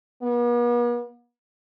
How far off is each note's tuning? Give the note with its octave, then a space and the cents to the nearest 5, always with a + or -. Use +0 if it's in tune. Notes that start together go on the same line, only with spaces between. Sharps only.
B3 -45